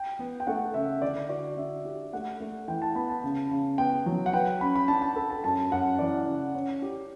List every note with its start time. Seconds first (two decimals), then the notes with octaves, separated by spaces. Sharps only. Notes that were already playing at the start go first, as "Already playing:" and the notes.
Already playing: G5
0.19 B3
0.40 G5
0.47 A3 F#5
0.74 C#3 E5
1.02 D3 D5
1.29 F#4 D5
1.57 D4 E5
1.85 G4
2.13 A3 F#5
2.40 A3
2.68 E3 G5
2.82 A5
2.95 B3 B5
3.10 A5
3.24 C#3
3.51 C#3
3.78 B3 G5
4.06 F#3
4.26 F#5
4.33 B4 G5
4.61 C#4 B5
4.75 B5
4.88 D4 A5
5.02 A5
5.16 A4 B5
5.30 A5
5.44 F#2 A5
5.71 F#2 F#5
5.99 E3 D5
6.27 C#3
6.55 C#4 C#5
6.82 G4